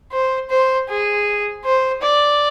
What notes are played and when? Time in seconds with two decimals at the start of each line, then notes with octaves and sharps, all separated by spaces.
0.12 C5
0.50 C5
0.89 G#4
1.65 C5
2.02 D5